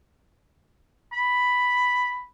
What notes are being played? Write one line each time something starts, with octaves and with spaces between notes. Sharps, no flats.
B5